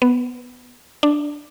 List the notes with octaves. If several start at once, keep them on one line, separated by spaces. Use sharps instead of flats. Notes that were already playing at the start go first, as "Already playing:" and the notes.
B3
D4